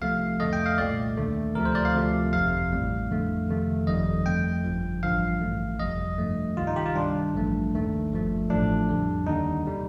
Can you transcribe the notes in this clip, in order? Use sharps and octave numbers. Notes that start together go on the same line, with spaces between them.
C2 C3 F3 A3 F5
F2 D3 A3 D#5
G5
F5
C2 A#2 A3 D5
D#2 D3 A3
D2 C3 F3 A3 A#4
C5
D5
F5
D2 C3 F3 A3
G1 F2 C3 F5
A1 A2 G3
F2 D3 A3
F2 C3 D#3 A3
G1 F2 D#3 G3 D#5
F2 D3 A3 G5
G1 G2 F3
A1 G2 D3 F3 F5
A1 A2 A3
G1 F2 C3 G3 D#5
G2 F3 A3
C2 C3 D#3 G3 F4
D#4
G4
F4
G2 D#3 G3 D4
A1 G2 F3 A3
D#2 D#3 A3
G1 G2 F3 A3
A1 A2 F3 A3 D4
F2 D3 G3
D#2 D3 G3 D#4
C3 G3